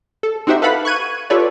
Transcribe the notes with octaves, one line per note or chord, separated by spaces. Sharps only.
A4
C4 D#4 F#4 G4 C5 E5
A4 B4 F5 F#5 B5
C#6 F#6 G#6 D#7
F4 G4 A4 B4 C#5 D5